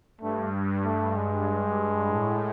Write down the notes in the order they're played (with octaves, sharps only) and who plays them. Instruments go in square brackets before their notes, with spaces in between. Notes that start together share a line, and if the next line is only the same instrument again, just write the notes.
[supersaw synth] G2 [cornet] A3
[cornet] A3
G#3
[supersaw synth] A2